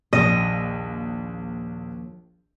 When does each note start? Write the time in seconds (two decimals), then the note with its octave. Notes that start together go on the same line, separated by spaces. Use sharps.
0.13 A#1 D#2 F3 D#5 G5